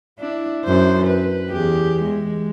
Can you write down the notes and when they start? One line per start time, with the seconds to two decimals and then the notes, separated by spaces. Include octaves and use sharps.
0.19 D4 E4
0.65 F#2 C5
1.07 B4
1.50 E2 G4 G#4
2.03 G#3